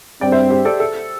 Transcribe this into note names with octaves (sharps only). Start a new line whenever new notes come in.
G2 G3 C4 D5 G5
C5 E5
G4 C5
A4 D5
A4